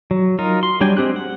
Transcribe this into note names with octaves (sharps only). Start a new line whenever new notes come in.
F#3
D#4 F4 A#4
C6
F#3 G3 D4 G5 G#5
G#3 C4 G4 F#6
F#5